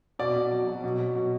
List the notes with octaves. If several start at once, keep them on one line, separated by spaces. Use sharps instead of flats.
B2 D5
B2
F#3
F#3
B2
F#3
B2